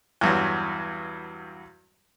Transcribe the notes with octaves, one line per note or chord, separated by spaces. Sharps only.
E2 G2 F#3